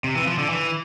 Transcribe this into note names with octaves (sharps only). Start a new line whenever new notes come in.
C3
E3
F3
D3
E3